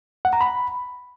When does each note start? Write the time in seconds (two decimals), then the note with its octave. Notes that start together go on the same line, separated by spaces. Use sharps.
0.25 F#5
0.33 A#5
0.41 B5